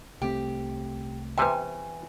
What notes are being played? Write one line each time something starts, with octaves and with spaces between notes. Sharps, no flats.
C2 A3 C4 G4
E2 C3 B4 C5 E5 G5 G#5